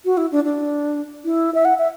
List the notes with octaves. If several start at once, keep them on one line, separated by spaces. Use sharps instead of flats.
F#4
E4
D4
D4
E4
E5
F#5
E5